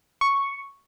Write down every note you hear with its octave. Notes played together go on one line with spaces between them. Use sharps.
C#6